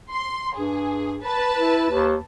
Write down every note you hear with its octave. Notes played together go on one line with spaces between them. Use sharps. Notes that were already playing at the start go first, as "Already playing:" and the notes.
C6
G2 G#4
B4 A5
E4
D#2